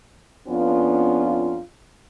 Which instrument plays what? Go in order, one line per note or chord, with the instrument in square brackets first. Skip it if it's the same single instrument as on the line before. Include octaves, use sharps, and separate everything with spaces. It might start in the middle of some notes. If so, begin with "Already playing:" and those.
[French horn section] F2 B3 C#4 D4 F4